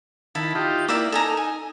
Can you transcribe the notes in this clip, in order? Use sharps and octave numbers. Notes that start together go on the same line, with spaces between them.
D#3 E4 A5 B5
D#4 F4 G4
A#3 E4 D5 E5 D6
D#4 A4 G#5 A#5
G#5